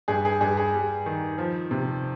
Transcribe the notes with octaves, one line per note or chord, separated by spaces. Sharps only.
G2 G#4
G#4
G2 G#4
G#4
G3
D#3
F3
C3